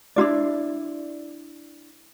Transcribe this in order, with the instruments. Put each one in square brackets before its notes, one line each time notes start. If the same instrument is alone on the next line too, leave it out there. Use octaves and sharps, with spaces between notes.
[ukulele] D4 E4 F4 D5